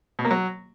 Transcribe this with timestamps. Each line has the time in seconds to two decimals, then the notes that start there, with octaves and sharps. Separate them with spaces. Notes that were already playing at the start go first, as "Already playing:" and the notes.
0.19 B2
0.25 A#3
0.31 F#3